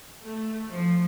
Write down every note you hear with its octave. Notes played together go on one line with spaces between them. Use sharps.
A3
F3